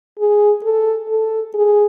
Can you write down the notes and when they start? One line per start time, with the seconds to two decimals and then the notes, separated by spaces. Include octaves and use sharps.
0.19 G#4
0.64 A4
1.09 A4
1.54 G#4